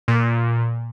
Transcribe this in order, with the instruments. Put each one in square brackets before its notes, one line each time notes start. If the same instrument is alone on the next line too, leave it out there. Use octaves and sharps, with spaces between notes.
[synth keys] A#2